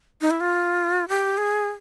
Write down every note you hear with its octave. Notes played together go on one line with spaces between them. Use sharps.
D#4
E4
F4
G4
G#4